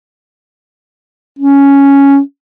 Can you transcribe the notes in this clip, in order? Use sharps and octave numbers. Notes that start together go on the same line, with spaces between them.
C#4